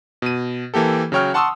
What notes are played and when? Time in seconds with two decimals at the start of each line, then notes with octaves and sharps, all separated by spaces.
0.22 B2 D#7
0.74 E3 A#3 G4 A4
1.12 C#3 F#3 C#5 G5 F6
1.34 F#5 A5 C6 C#6 D#6 E6